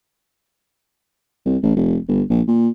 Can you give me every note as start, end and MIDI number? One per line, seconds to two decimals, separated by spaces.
1.46 1.57 36
1.63 1.72 33
1.76 1.98 29
2.08 2.22 31
2.30 2.41 34
2.48 2.69 46